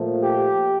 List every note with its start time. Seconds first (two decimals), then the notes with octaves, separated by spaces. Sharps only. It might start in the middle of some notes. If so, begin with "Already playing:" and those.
Already playing: A#2 F3 A3
0.23 G4